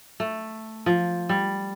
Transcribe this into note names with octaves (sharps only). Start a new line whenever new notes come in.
A3
F3
G3